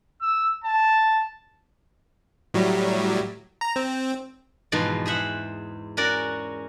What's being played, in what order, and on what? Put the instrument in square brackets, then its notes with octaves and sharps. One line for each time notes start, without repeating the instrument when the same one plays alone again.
[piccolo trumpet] E6
A5
[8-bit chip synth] A2 F#3 G3
A#5
C4
[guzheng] E2 G#2 B2 F3
G#4 C5 E5 F#5
C#4 F#4 A#4 D5